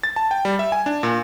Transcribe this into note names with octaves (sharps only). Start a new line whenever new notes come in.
A6
A5
G5
G3
E5
G#5
D4
A#2